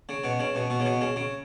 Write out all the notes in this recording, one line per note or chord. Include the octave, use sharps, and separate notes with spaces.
C#3
B2
C#3
B2
B2
C#3
B2
C#3
C#3